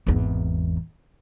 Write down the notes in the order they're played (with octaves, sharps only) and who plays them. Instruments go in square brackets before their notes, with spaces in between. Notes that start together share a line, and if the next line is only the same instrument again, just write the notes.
[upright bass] G#1 E2